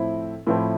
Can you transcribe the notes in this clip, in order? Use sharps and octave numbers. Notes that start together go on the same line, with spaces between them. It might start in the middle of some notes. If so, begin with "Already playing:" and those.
Already playing: A2 F3 C4 E4
A2 F3 C4 E4